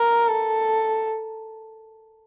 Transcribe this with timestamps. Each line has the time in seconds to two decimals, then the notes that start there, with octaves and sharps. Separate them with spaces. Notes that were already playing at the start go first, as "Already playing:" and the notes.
Already playing: A#4
0.28 A4